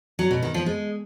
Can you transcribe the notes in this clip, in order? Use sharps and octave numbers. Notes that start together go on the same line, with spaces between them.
F#3
B2
D#3
F3
G#3